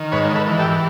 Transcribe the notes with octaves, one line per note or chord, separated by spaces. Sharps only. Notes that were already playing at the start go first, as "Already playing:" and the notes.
Already playing: D#3
G#2 B4 C#5
A4 B4
E3
G4 A4